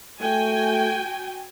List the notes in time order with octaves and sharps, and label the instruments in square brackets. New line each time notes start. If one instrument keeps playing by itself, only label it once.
[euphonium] A3 [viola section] F#4 G5 G#5